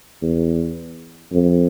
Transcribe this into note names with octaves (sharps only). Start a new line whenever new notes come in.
E2
F2